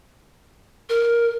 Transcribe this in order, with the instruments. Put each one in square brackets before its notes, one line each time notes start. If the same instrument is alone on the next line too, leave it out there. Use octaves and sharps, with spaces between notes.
[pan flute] A#4